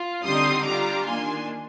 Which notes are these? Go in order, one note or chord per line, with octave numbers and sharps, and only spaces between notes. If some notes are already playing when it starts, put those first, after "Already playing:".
Already playing: F4
D3 G3 C4 D#4 C6 D#6
G3 D4 F4 A#5 D6
D#3 A#3 D4 G#5 C6